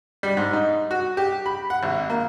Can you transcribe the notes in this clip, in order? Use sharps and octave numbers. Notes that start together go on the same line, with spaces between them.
G3
G#2
D#4
F#4
G4
B5
F#5
G#1
A#3